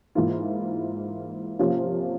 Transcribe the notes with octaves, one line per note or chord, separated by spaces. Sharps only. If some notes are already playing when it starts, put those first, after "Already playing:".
G#2 E3 A#3 F4
C3 F3 A#3 C#4 F4